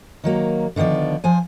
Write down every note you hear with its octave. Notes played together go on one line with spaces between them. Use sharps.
D#3 F#3 A#3
D3 D#3 F3 B3 D5
F3 C5 G#5